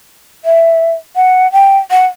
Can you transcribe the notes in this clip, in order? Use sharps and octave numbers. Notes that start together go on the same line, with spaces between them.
E5
F#5
G5
F#5